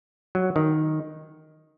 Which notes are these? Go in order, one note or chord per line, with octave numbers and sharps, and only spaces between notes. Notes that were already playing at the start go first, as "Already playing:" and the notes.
F#3
D#3